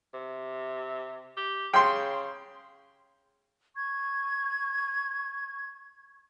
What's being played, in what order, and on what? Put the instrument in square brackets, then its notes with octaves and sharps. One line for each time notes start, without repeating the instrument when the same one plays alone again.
[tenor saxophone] C3
G4
[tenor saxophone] C#3 [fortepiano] G5 C6
[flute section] C#6 G#6